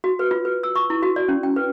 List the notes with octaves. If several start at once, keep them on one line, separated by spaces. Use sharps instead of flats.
F#4
B4
F4
B4
E6
C#6
E4
F#4
D5
C#4
G5
B4